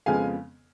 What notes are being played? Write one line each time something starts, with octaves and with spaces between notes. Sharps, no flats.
F2 C#3 F3 G#3 B3 F5 G#5